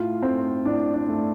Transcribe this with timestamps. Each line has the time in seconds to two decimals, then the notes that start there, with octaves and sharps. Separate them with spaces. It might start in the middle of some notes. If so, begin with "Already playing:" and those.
Already playing: A2 F4
0.23 A3 C4
0.65 A2 D4
0.94 D4
1.09 A3